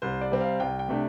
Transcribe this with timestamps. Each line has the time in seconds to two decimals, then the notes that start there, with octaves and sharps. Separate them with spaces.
0.02 C2 C5
0.21 D5
0.31 C3 G3 C4
0.41 F5
0.60 C2 G5
0.79 G5
0.88 C3 A3 D4